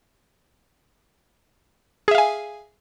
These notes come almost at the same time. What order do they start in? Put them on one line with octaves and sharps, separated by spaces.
G#4 E5 F5 G#5